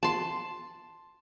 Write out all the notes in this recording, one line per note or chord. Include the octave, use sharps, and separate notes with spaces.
A5 C6